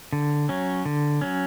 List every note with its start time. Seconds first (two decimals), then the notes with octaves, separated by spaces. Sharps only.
0.13 D3
0.49 F#3 C#4
0.85 D3
1.21 F#3 C#4